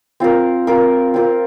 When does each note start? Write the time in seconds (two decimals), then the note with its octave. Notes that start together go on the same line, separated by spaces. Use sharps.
0.20 C4 F4 A#4
0.67 C4 F4 A#4
1.14 C4 F4 A#4